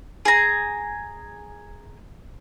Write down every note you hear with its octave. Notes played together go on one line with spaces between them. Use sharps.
G#4 A#5